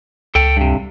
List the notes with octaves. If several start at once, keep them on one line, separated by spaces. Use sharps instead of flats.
C#2 A4 G5
G2 C3